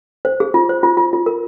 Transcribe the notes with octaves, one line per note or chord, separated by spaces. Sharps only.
C5
G#4
F4
C5
F4
F4
F4
A#4